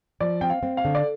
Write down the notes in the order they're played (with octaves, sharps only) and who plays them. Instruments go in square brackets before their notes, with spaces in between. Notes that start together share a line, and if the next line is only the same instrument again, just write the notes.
[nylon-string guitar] F3 [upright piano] D5
[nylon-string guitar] C4 [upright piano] G5
[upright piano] F5
[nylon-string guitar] C4
[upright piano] F5
[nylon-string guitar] D3
[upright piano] D5